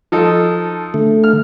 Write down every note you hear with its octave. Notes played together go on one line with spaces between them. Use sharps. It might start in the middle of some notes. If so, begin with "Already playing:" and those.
F3 D#4 A4
D3 A3
F6